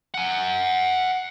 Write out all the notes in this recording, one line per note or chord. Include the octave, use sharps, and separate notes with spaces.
F#5 G#5